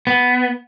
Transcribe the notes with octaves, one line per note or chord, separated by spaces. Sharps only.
B3